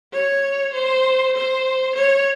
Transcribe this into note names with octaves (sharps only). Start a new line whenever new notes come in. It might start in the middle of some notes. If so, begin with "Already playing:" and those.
C#5
C5
C5
C#5